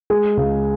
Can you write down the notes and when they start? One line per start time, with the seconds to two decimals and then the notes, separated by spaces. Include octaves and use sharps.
0.10 G#3 G#4
0.37 C#2